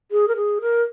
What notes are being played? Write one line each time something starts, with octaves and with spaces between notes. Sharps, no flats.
G#4
A#4
G#4
A#4